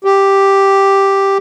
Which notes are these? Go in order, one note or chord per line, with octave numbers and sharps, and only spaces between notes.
G4